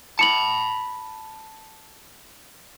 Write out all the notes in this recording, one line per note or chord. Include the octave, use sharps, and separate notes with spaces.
A5 B5 C#7 F#7